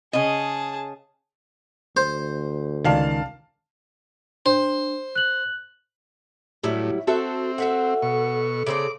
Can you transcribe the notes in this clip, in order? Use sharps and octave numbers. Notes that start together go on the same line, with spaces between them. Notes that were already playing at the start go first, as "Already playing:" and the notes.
C#3 G#4 D#5 A5
D2 C5
C#2 D#3 D5 F5 A5
D4 C5
F#6 F#7
A2 F#3 G3 E4
C4 F#4 A4 E5
F#4 A4 E5 F#5
B2 C#6
C#3 C4 D4 D6